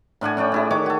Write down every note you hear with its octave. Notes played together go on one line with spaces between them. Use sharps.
A2 D4 F#5 G#5
C#4 D4 D5 G5
D4 E4 G#4
D#3 C#5 D#5 D6
F#4 A4